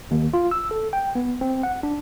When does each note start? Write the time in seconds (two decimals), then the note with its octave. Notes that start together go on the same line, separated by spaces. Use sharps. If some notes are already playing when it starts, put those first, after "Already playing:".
0.11 D#2
0.33 F4
0.51 E6
0.71 A4
0.93 G5
1.15 B3
1.41 C4
1.63 F#5
1.83 D4